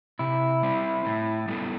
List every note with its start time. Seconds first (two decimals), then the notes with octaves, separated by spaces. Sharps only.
0.19 C3 E4
0.63 G3 C4
1.05 A2
1.48 G3 B3 E4 A4